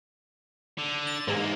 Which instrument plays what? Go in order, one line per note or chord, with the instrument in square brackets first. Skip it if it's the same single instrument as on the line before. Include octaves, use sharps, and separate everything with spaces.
[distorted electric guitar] D3
[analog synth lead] A6
[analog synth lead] G#2 [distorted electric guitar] E3 A#3